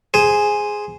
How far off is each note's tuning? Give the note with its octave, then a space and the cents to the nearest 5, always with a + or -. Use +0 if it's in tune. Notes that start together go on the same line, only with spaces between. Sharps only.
G#4 +0 C5 -5